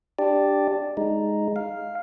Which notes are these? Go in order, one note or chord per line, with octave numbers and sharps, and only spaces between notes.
D4 G4 D5
G#3 D#4
F5